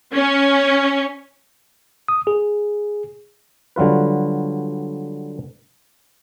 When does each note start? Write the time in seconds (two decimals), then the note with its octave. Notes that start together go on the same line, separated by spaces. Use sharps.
0.13 C#4
2.08 D#6
2.27 G#4
3.76 D3 F#3 G3 F4 B4